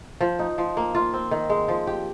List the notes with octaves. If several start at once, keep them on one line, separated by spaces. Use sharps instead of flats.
F3
D#4
F3
A#3
F4
C4
D#3
G#3
F3
G4